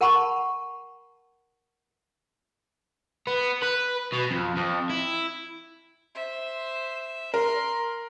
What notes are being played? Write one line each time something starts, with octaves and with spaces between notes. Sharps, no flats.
A#4 F#5 A5 B5 C#6
B3
B4
B2
F2
F2
E4
C5 E5
A#4 C6